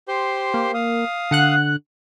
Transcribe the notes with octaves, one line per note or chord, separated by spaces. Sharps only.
G4 C5 C6
A#3
F5 D#6
D3 F#5 F#6